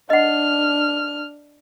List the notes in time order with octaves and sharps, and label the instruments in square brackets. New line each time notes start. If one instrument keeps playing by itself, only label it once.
[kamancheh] D4 F6 [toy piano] D#5 F#5